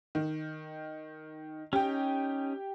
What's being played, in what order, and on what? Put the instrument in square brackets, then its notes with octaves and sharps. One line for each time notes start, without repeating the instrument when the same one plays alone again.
[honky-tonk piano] D#3
[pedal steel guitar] C#4 D#4 [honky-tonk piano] G4 G5